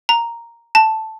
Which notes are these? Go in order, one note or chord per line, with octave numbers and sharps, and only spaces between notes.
A#5
A5